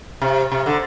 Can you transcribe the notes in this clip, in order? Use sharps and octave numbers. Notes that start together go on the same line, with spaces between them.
C3
C3
D3